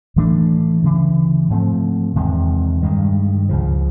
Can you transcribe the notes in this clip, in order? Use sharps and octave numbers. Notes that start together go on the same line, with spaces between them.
A2 E3 A3 D4
D2 C#3 E3
G#2 F3 A3 C4
E2 C3 D#3 G#3
G2 D#3 G#3
C#2 C#3 F3